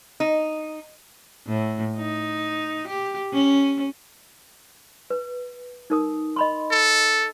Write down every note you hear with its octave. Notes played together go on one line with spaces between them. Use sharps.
D#4
A2
D#4
G4
C#4
B4
D#4 A#4 D#6
D#5 B5 C6
A4